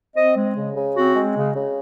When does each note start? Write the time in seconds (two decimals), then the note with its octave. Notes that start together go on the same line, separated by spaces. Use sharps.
0.15 C4 D#5
0.35 G#3
0.55 C#3
0.76 C#3
0.95 C4 F#4
1.15 G#3
1.35 C#3
1.55 C#3